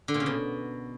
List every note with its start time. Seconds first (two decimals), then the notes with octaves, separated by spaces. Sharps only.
0.08 D3
0.14 A#2
0.20 C#3
0.26 B2